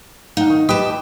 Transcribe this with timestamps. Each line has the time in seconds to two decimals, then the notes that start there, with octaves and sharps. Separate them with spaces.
0.37 D#4 F5 F#5
0.50 D#3
0.69 G4 B4 D#5 G5 A5